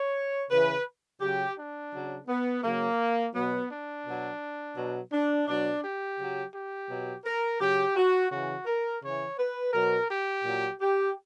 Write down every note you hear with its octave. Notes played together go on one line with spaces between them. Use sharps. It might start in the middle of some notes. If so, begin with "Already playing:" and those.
Already playing: C#5
C#3 E3 B4
C#3 F#3 G4
D4
C#3 F#3
B3
C#3 F#3 A#3
B2 F#3 B3
D4
B2
F#3
B2 F#3
D4
B2 F#3 D4
G4
C#3 F#3
G4
B2 F#3
A#4
C#3 F#3 G4
F#4
C#3 E3 F#4
A#4
C#3 E3 C#5
B4
B2 F#3 A#4
G4
A#2 F#3
G4